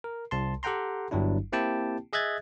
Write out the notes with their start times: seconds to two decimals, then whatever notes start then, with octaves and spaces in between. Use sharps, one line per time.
0.04 A#4
0.31 C2 A5 C6
0.63 G4 A4 F#5 G5 A#5 C6
1.11 G1 G2 F#3 D4 E4
1.52 A#3 C4 E4 G4 G5 A5
2.13 G#4 D#5 E5 F#6 G#6 A6